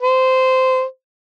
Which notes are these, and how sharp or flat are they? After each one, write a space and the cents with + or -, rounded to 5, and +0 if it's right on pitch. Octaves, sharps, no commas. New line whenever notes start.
C5 -15